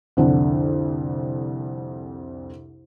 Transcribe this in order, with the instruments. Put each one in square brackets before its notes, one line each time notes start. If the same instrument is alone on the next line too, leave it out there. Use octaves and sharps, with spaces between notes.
[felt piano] C2 F2 D3